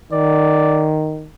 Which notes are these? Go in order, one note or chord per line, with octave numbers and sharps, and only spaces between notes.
D#3 D5